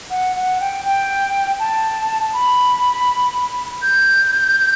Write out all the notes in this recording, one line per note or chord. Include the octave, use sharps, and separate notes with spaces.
F#5
F#5
G5
G5
A5
B5
G6